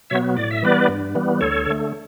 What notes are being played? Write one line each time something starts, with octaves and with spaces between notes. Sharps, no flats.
B2 F#3 B3 C#5 E5
A2 D5
E5
E3 G3 B3 B4 D5
G2
E3 G3 B3
D2 A4 C#5
D3 A3